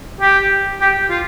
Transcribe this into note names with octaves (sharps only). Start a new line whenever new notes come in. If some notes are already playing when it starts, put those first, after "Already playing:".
G4
G4
F4